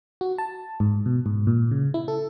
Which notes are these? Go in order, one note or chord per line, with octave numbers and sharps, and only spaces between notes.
F#4
A5
G#2
B2
G#2
A#2
C#3
E4
A4